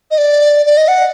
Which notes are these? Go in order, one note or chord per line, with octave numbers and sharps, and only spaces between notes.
D#5
D5
D5
D#5
F#5